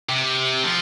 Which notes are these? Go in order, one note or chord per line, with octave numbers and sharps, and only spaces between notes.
C3
F3